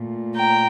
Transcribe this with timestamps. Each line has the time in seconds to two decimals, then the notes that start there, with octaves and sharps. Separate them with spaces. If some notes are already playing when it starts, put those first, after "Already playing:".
Already playing: A#2 A3
0.35 G5 A#5